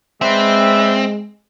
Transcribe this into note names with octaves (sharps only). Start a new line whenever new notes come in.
G#3 C4 B4 D5 E5